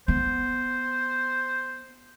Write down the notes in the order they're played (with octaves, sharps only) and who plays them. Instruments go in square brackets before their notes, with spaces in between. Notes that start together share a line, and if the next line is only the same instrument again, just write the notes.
[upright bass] B3 [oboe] C5